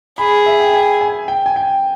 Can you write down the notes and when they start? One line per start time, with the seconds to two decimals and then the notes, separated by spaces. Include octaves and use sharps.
0.18 G#4 B5
0.46 E5
0.60 G5
0.73 G#5
1.01 G#5
1.28 G5
1.46 G#5
1.56 G5